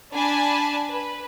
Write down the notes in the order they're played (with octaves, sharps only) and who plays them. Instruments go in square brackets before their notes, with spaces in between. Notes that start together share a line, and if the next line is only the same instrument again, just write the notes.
[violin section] D4 G#5 A5 B5
B4